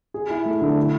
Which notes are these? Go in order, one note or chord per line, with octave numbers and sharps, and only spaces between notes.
G#4
E4
A3
D3
E4